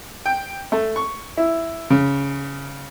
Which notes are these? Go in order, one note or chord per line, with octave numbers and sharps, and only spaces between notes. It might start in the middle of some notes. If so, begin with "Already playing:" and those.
G5
A3
C#6
E4
C#3